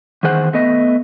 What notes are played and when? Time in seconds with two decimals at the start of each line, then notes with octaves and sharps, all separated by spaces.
0.23 E2 D#3 G#4 C5 F#5
0.53 A3 B3 D#5